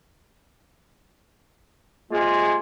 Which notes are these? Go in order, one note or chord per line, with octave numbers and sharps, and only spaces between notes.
C3 G#3 A#3 F4